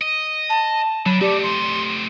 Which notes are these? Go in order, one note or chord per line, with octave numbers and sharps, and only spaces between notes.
D#5
A5
D3 F#3 B5
A3 C4 G4 D5
C6